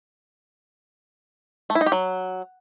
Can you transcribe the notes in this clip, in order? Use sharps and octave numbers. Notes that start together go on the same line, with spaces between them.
A3
E4
D#4
G4
F#3